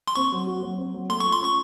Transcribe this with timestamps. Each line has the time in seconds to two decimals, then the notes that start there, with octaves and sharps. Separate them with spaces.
0.08 C6
0.15 C4 C#6
0.32 F#3
0.47 F#4
0.63 F#3
0.78 C4
0.94 F#3
1.09 A3 C6
1.20 C#6
1.26 F4
1.32 C6
1.41 C#4 C#6